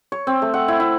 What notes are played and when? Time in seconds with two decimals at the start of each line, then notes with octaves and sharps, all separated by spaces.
0.12 C#5
0.27 C4
0.42 A3
0.54 F#5
0.68 E4
0.80 E4